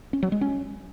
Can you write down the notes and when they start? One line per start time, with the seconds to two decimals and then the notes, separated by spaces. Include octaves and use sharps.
0.13 C#4
0.23 F#3
0.32 G#3
0.41 C#4